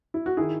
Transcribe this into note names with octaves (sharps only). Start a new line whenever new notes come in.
E4
F#4
D#3 E4 G#4